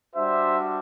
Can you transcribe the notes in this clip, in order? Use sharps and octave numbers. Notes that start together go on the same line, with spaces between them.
G3 D4 F#4 C5 E5